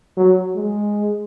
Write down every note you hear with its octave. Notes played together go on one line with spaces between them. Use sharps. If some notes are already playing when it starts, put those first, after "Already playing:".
F#3
G#3